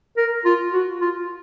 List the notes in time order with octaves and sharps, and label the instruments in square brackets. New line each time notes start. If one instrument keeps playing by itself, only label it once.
[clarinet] A#4
F4
F#4
F4